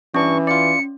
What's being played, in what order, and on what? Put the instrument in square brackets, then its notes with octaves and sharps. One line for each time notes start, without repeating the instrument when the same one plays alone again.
[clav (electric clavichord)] G2 D4 [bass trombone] E3 [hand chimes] C#4 [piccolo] C#6
[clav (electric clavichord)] F4 D5 [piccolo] C#7